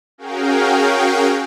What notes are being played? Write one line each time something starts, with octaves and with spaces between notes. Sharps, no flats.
C#4 F#4 G#4 A#4 F5 G5